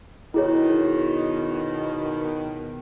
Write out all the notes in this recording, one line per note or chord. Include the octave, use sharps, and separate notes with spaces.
B2 D#3 E4 G#4 C#5